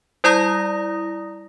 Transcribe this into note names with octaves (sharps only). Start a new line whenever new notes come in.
G3 E4 D5 A#5 D#6 A#6